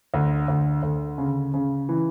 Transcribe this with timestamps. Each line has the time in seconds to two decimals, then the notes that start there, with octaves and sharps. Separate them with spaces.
0.14 D2
0.48 D2
0.83 D2
1.18 C#3
1.54 C#3
1.89 E3